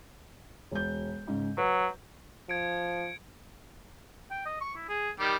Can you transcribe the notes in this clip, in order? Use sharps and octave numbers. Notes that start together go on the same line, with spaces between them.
E1 G6
G#2 C#3
F#3 B4
F3 G#6 C#7 D7
G5
D#5
C#6
E4
G#4
D#3 G3 G4